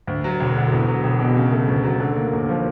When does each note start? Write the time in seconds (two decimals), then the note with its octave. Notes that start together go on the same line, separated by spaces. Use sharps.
0.07 D2
0.24 F#3
0.40 E1
0.56 D3
0.72 E2
0.88 F#3
1.03 E1
1.20 B2
1.37 C#3
1.52 A3
1.68 D2
1.84 F#3
2.00 D3
2.16 A#3
2.33 D#2
2.49 F3